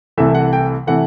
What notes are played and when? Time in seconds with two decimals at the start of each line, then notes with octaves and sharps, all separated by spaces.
0.18 C2 C3 E3 A3 E5
0.35 F#5
0.53 G5
0.87 C3 E3 A3 F#5